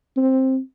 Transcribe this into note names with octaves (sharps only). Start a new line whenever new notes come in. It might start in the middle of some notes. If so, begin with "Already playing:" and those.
C4